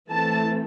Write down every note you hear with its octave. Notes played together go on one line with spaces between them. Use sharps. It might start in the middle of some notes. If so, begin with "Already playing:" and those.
E3 A3 C4 A5